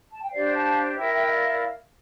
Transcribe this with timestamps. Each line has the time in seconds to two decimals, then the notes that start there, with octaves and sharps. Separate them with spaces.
0.12 A5
0.22 G5
0.32 D4 G4 C5 D5 F5
0.54 F5 A5
0.97 E4 A#4 E5 G5
1.13 E5 G5
1.24 E5
1.29 D5 F5
1.45 D5 F5